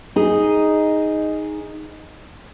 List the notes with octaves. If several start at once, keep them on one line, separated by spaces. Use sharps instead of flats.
D#4 G#4